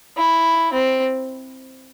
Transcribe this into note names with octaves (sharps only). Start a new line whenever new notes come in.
E4
C4